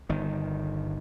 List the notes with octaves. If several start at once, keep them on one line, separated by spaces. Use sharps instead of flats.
G1 D#3